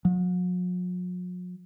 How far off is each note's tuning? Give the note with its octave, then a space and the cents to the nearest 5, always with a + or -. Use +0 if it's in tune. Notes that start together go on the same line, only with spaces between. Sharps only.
F#3 -45